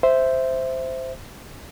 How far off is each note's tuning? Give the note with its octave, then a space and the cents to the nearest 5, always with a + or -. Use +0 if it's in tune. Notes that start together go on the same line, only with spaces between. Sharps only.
C5 -5 E5 +0